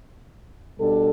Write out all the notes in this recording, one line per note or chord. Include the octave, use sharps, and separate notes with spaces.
B2 G3 D4 A4